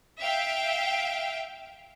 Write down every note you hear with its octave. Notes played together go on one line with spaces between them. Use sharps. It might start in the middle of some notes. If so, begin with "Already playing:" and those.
E5 F5 G5